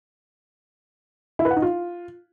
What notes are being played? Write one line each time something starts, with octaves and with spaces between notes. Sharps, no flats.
E4
B4
F#5
D#4
F4